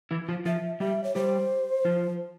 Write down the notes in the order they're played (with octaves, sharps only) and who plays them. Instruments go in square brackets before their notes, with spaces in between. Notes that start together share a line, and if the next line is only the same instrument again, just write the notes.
[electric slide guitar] E3 E4
F3 F4
[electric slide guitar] F3 F4 [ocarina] E5
[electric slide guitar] G3 G4 [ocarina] E5
[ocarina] C#5
[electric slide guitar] G3 G4 [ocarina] C5
[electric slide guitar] F3 F4